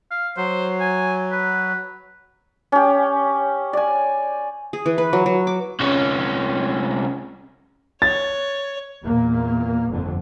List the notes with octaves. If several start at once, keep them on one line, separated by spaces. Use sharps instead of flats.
F5
F#3 C5
G#5
B4
C#4 G4
D5 G#5
G#4
E3
B4
F#3
F#3
D6
C2 C#4
C#5 A6
E2 A#2 A#3
G1 F2 D3